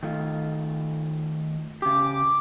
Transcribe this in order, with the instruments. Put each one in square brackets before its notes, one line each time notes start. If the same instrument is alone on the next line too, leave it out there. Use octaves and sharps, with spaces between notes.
[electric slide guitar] D#3 A3 F4
[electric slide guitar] C#3 G4 [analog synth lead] D6